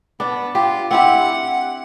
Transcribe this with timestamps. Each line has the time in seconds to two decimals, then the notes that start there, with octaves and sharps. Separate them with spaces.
0.20 B3 D4
0.55 F4 G4
0.91 C4 E4 G4 F#5